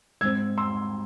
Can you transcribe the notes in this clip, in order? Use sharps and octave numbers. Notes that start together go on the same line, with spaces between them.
G#2 G#3 C4 E6 G#6
C6 E6